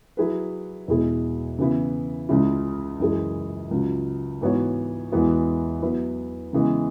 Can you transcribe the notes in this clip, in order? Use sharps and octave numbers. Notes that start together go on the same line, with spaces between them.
F#3 E4 G#4 B4
E2 B2 G#3 E4 G#4
C#3 E3 B3 E4
C#2 C#3 G#3 C#4 E4
F#2 E3 G#3 E4 G#4
C#2 C#3 F#3
G#2 E3 B3 F#4 C#5
E2 E3 G#3 B3 F#4
F#3 B3 E4 B4
C#3 E3 G#3 B3